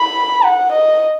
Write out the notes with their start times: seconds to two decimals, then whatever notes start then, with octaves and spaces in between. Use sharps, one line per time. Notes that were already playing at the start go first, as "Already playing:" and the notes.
Already playing: B5
0.44 F#5
0.72 D#5